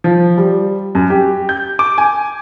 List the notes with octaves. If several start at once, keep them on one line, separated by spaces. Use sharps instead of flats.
F3
G3
F#2
G4
G6
D6
G#5